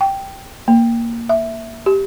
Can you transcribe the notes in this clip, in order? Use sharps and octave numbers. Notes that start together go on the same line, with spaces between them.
G5
A#3
E5
G4